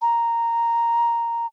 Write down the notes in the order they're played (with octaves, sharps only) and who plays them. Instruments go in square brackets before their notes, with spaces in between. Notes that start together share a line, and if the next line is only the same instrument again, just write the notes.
[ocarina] A#5